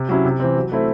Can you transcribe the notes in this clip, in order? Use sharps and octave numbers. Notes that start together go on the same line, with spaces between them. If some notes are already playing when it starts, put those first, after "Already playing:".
Already playing: C3
F#3 C#4 E4
C3
E3 C4
F#3
A3 C4 E4